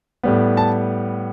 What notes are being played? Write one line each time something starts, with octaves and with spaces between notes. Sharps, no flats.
A2 G3 B3
A5